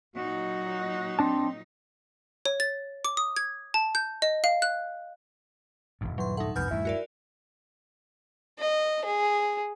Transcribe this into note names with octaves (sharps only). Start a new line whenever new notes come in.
A#2 F#3 D#4 F#4
C4 D4 A5
C#5
A6
D6
D#6
G#6
A5
G6
D#5
F5
F#6
D#1 G#1 G2
E3 F#3 C6
A3 D#4 F#5
C2 F2 A2 B3 G#5 F6 G6
D#1 G2 A3 E4
F#4 A#4 D5
D#5
G#4